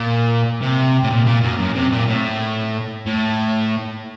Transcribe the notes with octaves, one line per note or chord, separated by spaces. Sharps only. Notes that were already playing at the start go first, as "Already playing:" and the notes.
Already playing: A#2
C3
A2
A#2
A#2
F#2
F#2
C3
A#2
A2
A2